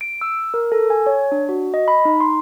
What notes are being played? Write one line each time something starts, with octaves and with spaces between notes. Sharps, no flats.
D7
E6
A#4
A4
G#5
C#5
D4
F#4
D#5
B5
D#4
C6